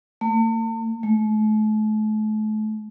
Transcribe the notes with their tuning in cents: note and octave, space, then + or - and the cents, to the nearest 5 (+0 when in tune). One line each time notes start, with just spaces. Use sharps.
A3 +45
A3 -40